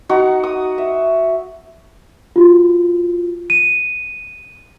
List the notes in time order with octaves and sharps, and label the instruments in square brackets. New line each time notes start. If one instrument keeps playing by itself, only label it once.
[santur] D#4 F#4 F#5
D#6
E5
[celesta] F4 F#4
D#7